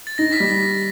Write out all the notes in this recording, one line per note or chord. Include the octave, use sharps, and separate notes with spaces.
A6
D#4 A#6
B6
G3